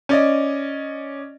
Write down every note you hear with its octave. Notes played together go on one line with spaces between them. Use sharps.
C#4 D5 D#5